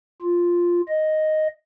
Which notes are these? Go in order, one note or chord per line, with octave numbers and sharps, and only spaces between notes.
F4
D#5